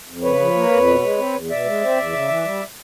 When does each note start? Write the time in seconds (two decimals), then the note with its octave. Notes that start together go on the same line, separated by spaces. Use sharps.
0.08 F2
0.23 C#3 B4 C#5
0.40 F3
0.55 A#3
0.71 F2
0.87 B2
1.02 G#3
1.18 C4
1.33 E2
1.50 B2 D5 E5
1.65 G#3
1.81 C4
1.97 E2
2.13 C#3
2.28 E3
2.45 G3